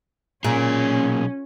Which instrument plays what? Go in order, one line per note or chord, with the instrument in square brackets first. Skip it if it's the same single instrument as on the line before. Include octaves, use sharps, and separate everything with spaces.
[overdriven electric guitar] B1 G#4 [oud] A#2 [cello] C#4